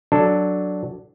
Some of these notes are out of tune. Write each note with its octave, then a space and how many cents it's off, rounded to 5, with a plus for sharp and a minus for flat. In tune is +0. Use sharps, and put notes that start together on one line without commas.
F#3 +0 D4 +0 A4 +0